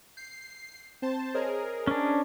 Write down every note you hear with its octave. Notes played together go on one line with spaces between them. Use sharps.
G6 C7
C4 C5 A5
G#4 A#4 C5 C#5 D#5
C#4 D4